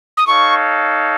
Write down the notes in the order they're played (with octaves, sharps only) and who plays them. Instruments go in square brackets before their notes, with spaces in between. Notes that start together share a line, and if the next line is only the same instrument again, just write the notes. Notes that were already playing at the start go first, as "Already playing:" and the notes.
[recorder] D#6
[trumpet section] D#4 A4 C#5 F5 [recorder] C#6